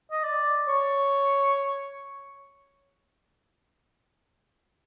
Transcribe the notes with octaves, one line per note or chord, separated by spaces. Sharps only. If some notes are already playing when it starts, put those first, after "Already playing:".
D#5
D5
C#5